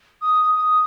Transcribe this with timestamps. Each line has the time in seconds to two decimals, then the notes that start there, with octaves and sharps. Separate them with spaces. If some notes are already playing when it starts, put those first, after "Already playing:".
0.22 D#6
0.55 D#6